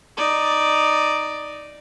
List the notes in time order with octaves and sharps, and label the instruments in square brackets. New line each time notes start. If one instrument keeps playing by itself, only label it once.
[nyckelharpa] D#4 D5